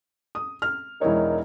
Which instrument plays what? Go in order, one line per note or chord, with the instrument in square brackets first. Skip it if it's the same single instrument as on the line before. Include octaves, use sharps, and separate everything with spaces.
[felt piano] D#6
F6
[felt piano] E1 E4 C#5 [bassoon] D#3